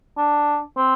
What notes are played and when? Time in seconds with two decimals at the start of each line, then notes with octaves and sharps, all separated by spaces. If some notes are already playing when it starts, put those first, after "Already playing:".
0.18 D4
0.77 C4